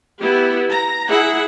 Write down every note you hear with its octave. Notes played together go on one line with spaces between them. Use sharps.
B3 E4 G4
A#5
E4 G#4 F#5